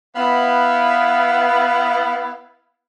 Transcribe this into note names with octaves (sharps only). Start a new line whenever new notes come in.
B3 E4 F5